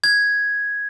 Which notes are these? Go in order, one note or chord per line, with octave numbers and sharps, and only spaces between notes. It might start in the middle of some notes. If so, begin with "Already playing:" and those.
G#6